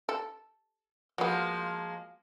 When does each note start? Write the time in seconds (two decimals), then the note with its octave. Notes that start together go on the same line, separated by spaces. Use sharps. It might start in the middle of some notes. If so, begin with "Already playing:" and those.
0.09 A4
1.18 F3 F#3 G#3 A#3 B3